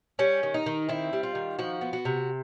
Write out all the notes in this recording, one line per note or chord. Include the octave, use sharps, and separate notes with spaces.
G3 C#4
D#3
D#4
D#3
C4 E4
G3
F4
D#3
F3 F#4
B3
F#4
C3